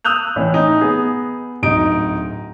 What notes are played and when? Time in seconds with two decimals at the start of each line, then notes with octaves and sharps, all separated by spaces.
0.05 D#6 E6 F#6 G6 F7
0.36 A2 E3 C#4
0.54 D#4
0.81 B3 G#4
1.63 D1 D#4 D7